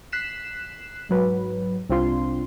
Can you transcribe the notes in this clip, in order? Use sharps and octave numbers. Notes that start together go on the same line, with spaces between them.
F#6 B6 C7 E7
G#2 F#3 B4
C2 C4 D4 F4 C6